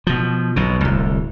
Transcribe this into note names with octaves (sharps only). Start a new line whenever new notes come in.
B2 F3
B1 B2
D1 C2